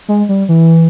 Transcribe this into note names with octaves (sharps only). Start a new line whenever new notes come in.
G#3
G3
E3